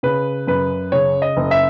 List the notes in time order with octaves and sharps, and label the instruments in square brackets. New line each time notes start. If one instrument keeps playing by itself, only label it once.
[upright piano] C#3 B4
F#2 B4
C#3 C#5
D#5
F#1
E5